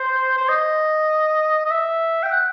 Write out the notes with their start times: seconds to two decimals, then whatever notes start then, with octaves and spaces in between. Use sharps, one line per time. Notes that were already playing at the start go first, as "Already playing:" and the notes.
Already playing: C5
0.37 C5
0.49 D#5
1.66 D#5
1.70 E5
2.23 G5
2.31 F#5